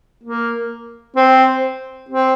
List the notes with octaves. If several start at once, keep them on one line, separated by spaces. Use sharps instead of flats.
A#3
C4
C4